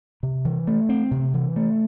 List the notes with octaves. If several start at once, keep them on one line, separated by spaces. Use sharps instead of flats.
C3
E3
A3
C4
C3
E3
A3